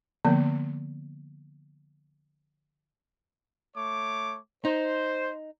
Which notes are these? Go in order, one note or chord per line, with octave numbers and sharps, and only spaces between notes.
D3 F3 A#3 B3
A3 C#5 D6
D#4 C5